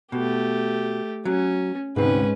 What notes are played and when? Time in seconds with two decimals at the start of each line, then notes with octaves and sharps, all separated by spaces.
0.12 B2 A3 G4
1.25 F#3 C#4
1.96 D2 G#2 C3 C#4 B4